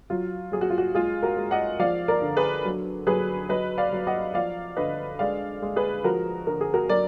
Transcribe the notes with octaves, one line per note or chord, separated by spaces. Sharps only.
F#3 F4
F#3 G#4
F#4
F4
F#4
G#3 F4 G#4
F#4 A#4
G#3
D#5 F#5
F3 D5 F5
A#4 D5
D3
G#4 B4
F#3
F#3 G#4 B4
F#3 B4 D#5
D5 F5
F#3
D#5 F#5
F3 D5 F5
D3 B4 D#5
G#3 D5 F5
G#3
G#4 B4
F3 F#4 A#4
D3 A#4
G#4
F#4 A#4
F#3 A#4 D5